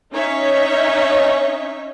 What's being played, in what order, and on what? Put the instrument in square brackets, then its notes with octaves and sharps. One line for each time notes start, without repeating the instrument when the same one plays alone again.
[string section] C#4 D#4 C#5 E5